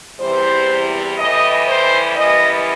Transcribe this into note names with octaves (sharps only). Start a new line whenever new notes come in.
E2 C3 E3 G3 C5
A2 E3 G3 D#5
C5
F#2 E3 G3 D#5